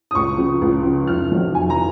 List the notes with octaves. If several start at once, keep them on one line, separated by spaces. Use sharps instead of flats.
D#6
C#2 C#6
C#3 F3
C#2
C#3 F3
F1 F6
F2 D#3 F#3
F1 G#5
A#5